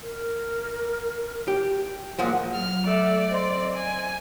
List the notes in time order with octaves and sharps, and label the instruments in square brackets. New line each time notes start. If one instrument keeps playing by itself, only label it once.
[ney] A#4
[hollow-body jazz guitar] G4
[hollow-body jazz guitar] A#2 F3 G#3 [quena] F#5
[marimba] F#3 [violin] F6
[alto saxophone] A3 [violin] D5
[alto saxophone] C4 [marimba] D#5 C6
[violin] G#5